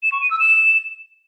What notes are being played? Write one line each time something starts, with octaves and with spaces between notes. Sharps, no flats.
E7
C#6
D#7
E6
E7